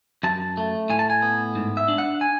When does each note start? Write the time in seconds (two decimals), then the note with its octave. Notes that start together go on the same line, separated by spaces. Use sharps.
0.23 F#2 A5
0.57 A3
0.90 A2 G#5
0.99 A5
1.10 G#5
1.22 B3
1.55 G#2
1.77 E5
1.88 D4
1.98 F#5
2.21 G#5